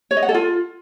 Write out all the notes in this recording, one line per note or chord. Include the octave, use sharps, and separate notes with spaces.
C#5
D#5
F#5
A4
F4